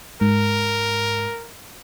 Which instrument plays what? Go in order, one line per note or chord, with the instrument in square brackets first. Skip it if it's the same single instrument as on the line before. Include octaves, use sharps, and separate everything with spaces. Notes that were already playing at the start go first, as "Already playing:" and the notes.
[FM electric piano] G#2 [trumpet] A#4